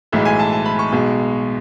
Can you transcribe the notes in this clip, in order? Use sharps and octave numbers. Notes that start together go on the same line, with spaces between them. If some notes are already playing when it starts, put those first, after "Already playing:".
B1 A2 E3 G#3 E5
G#5
A5
A5
B5
C#6
B1 B2 G#3